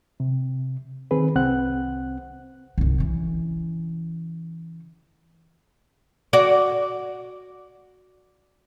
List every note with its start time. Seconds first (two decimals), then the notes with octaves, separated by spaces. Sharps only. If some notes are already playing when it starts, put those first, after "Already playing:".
0.20 C3
1.11 D#3 C4 G#4 B4
1.35 C2 C4 F#5 F#6
2.78 C2 D#4
2.98 C#3 E3
6.33 F#4 D5